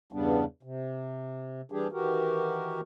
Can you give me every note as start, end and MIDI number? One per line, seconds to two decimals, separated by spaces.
0.12 0.45 40
0.12 0.45 43
0.12 0.45 49
0.12 0.45 55
0.12 0.45 59
0.12 0.45 62
0.63 1.61 48
1.72 1.88 52
1.72 1.88 55
1.72 1.88 62
1.72 1.88 67
1.72 1.88 68
1.92 2.81 51
1.92 2.81 52
1.92 2.81 66
1.92 2.81 67
1.92 2.81 70